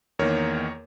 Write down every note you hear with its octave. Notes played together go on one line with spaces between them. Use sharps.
E2 D#3 A#3 A#4 C#5